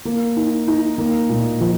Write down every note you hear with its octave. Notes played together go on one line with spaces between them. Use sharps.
A#3
D#4
D#4
A#3
A#2
F3